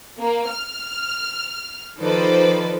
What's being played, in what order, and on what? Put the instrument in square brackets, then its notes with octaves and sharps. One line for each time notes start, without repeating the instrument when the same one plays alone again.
[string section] A#3
F6
D#3 F3 A4 B4 C5 D5